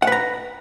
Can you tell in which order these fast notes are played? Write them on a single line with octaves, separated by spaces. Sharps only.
F#5 B4 A#5